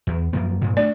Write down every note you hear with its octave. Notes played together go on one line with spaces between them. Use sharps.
E2
F#2 F3 A#3
G2 A#2 C#3
A3 D4 D5